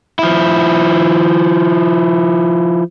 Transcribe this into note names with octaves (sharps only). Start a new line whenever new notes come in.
F3 E4